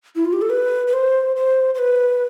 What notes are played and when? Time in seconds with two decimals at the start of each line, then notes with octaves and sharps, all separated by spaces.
0.16 E4
0.25 F4
0.33 G4
0.42 A4
0.50 B4
0.87 B4
0.93 C5
1.36 C5
1.75 C5
1.79 B4